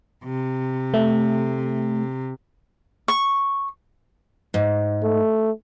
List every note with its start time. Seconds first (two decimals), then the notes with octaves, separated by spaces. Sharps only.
0.24 C3
0.94 A3
3.08 C#6
4.54 G#2
5.03 A3